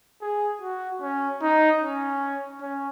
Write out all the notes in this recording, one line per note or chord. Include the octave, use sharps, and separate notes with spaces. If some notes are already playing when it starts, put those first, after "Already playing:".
G#4
F#4
C#4
D#4
C#4
C#4